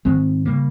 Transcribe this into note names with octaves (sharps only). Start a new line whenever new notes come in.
G#2 D#3 G#3 C4
C#3 G3 A#3